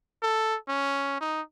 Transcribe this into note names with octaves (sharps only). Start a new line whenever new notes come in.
A4
C#4
D#4